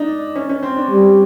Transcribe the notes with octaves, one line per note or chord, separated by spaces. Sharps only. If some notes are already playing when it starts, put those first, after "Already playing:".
Already playing: D4 D#4
C#4
C#4
C4
D4
G3